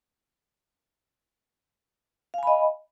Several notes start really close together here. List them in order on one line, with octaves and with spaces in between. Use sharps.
F5 G#5 B5 D#5